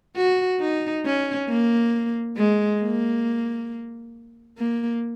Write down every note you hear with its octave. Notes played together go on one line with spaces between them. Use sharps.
F#4
D#4
C#4
A#3
G#3
A#3
A#3